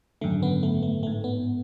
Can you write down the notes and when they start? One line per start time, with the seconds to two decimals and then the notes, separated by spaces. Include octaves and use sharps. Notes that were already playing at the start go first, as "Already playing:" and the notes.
0.21 G#1 F#2 D3 A3
0.43 B3
0.63 A3
0.83 A3
1.03 A1 A3
1.07 G#2
1.24 B3